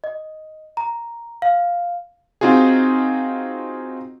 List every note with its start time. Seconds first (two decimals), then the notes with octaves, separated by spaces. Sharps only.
0.04 D#5
0.77 A#5
1.42 F5
2.41 C4 D#4 F4 F#4 G#4